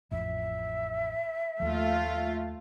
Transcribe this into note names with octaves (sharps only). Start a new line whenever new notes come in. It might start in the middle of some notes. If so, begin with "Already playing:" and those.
A1 F2 E5
D#2 F3 A3 F4